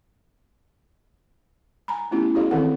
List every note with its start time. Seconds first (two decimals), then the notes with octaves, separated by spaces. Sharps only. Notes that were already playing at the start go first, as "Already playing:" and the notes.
1.88 G#5 A#5 B5
2.11 A3 B3 C#4 E4 F4 G4
2.35 E4 F#4 G#4 C#5 D#5 F5
2.51 D#3 E3 C4 A4 A#4 F#5